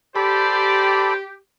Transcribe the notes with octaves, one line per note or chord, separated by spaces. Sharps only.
G4 A4 C5 D5 B5